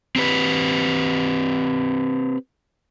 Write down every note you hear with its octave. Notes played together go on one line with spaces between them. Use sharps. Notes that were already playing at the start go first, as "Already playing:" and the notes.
C4 G4 B4